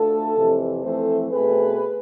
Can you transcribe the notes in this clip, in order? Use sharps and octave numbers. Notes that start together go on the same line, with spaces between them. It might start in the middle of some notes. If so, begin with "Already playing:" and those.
Already playing: D2 D3 A3 F4 A4
F2 C3 E3
F2 E3 A3 C4 A4 C5
B2 A3 C4 G#4 B4